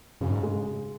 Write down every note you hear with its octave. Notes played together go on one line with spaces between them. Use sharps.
F#2 C#3
G#2
G#3